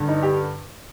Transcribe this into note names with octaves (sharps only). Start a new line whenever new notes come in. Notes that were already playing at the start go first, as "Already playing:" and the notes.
Already playing: G2 D3
D#4
G4